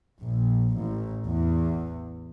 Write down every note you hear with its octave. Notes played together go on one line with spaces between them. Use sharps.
A#1
A1
E2